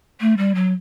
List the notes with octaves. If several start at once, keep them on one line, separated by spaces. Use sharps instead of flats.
A3
G3
F#3